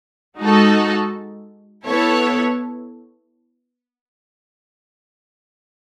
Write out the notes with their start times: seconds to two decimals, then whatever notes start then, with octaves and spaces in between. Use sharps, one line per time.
0.38 G#3 D#4 F#4 A4
1.86 B3 E4 A4 C#5